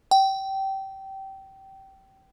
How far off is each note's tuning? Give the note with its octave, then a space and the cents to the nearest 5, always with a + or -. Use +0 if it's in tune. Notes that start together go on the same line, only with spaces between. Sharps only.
G5 -20